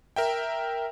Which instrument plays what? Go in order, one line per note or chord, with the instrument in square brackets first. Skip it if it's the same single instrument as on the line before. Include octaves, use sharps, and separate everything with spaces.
[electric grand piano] A#4 E5 G5